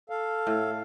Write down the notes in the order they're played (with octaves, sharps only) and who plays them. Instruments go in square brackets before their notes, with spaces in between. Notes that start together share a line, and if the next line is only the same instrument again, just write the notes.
[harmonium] A4 F5
[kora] A2